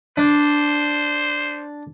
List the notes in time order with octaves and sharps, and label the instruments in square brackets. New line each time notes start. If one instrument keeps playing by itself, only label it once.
[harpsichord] D4 [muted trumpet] C5